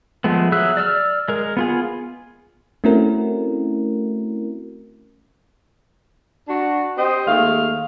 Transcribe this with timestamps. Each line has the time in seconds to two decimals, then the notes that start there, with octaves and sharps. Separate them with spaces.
0.24 F3 G#3 A3 B3
0.52 F#3 G#4 E5 E6 F#6
0.77 D5 E6 F6
1.28 G#3 A#4
1.57 B3 F4 G#4
2.84 A3 C4 C#4 E4 F#4 A#4
6.48 D4 F#4
6.98 C4 G4 C5 D#5
7.27 D#2 G#3 A3 F5